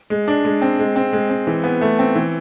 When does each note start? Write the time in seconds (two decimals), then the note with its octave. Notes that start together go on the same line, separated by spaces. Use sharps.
0.10 G#3
0.28 D4
0.45 G#3
0.62 C4
0.79 G#3
0.96 C4
1.13 G#3
1.30 C4
1.47 E3
1.64 B3
1.81 A3
1.99 C4
2.15 E3